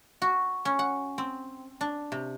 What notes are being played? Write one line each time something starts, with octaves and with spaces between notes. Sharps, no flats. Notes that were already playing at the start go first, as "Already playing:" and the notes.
F#4
C#4
F#5
C4
D4
C3